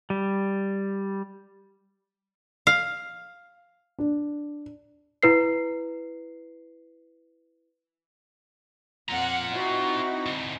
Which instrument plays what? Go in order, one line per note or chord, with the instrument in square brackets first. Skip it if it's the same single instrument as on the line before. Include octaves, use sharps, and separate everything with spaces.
[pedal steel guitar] G3
[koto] F5
[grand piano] D4
[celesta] E4 B4 C7
[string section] F2 F#5 [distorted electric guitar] F4 A#5
[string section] C4 D#4 E4 [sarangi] F#4
[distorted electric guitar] D2 G#2